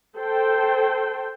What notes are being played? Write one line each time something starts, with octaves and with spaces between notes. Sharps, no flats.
A4 C5 G5